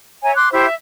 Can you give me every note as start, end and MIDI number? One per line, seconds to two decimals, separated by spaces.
0.23 0.33 73
0.23 0.33 76
0.23 0.33 80
0.23 0.33 82
0.36 0.49 84
0.36 0.49 86
0.36 0.49 90
0.52 0.65 64
0.52 0.65 67
0.52 0.65 72
0.52 0.65 76
0.65 0.74 76